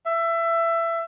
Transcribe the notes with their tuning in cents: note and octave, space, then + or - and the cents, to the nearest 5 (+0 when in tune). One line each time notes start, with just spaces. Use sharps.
E5 +20